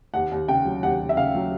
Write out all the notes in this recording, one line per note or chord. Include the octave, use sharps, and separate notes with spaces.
D#2 F#5
D#2
C#3 G5
F#3
D#2 F#5
D#2
E5
C#3 F5
F#3